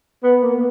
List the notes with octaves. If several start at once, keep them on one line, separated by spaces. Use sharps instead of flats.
B3
A#3
B3